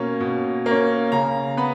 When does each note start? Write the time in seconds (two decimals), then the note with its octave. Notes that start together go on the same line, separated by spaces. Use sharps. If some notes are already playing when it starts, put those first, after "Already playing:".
Already playing: B2 A#3 C#4
0.20 B2
0.66 A#3 C#4
1.12 C#3 A#5
1.57 B3 B5